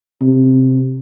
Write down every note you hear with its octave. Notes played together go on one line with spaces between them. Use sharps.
C3